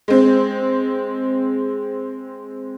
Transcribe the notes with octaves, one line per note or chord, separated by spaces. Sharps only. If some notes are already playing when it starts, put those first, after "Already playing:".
G#3 C4